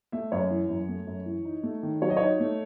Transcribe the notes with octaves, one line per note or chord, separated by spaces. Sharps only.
A3 E5
F#2 C#5
E3
F#2
A3
F#2
E3
D#4
A3
D#3
F#3 C#5
D#5
D#4 C#5
A3